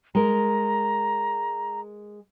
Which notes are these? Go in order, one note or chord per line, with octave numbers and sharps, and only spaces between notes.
G#3 A#4 A#5